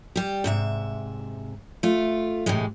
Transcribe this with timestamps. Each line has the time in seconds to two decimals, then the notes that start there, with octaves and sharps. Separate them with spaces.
0.16 G3 G4
0.44 G#2 C3 E5
1.83 A3 F4
2.46 A2 C3 E3 G#3